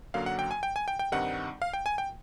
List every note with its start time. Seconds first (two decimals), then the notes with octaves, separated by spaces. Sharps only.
0.14 F#2 D3 F#3 A#3 F5
0.26 F#5
0.39 G5
0.51 G#5
0.63 G5
0.76 G#5
0.88 G5
0.99 G5
1.12 G2 D#3 G3 C4 D#4 F#5
1.62 F5
1.73 G5
1.86 G#5
1.98 G5